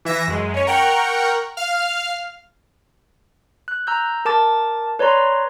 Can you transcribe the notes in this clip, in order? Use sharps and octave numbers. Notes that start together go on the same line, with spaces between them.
E3 E5 A#6
F#2 G#3
C#4 C#5
A#4 F#5 G5 A#5 C#6
F5 F6
F#6
A#5 E6 G6
A#4 A5 D6 A6
B4 C#5 D5 A#5 C6